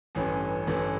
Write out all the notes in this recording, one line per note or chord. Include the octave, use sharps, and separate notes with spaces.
A1 G2 E3 A3 C#4
A1 G2 E3 A3 C#4